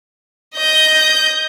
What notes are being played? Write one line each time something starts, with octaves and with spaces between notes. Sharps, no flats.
D#5 G6